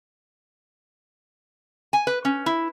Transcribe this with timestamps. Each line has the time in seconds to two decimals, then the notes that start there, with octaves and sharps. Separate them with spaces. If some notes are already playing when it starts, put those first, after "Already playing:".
1.93 G#5
2.07 B4
2.25 C#4
2.46 E4